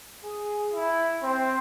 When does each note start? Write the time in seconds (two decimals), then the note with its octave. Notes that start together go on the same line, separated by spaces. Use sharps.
0.24 G#4
0.74 E4
1.23 C4